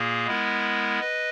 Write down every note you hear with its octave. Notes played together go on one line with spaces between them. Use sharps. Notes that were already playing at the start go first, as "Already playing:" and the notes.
Already playing: A#2 A#3 G#4
G#3 B3 E4 A#4
B4 D#5